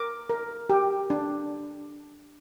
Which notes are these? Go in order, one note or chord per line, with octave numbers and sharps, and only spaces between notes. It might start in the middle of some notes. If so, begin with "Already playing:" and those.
Already playing: A#4 D6
A#4
G4
D4